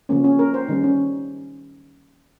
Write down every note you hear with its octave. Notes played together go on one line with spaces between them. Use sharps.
C#3 F3 A#3 C#4
C#4
A#4
C5
D#3 G3 C#4 D#4
C#4